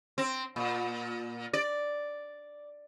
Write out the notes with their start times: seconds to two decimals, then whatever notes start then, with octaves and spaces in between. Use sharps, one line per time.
0.18 C4
0.56 A#2
1.53 D5